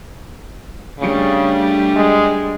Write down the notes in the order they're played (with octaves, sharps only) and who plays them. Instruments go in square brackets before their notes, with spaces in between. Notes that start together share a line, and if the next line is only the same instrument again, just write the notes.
[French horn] C#3 [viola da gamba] G3 A3 D4
[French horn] G#3